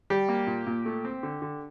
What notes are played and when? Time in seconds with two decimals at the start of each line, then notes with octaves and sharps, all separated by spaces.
0.10 G3 G4
0.29 A#3
0.47 A#2
0.67 A#2
0.86 A3
1.05 C4
1.23 D3
1.42 D3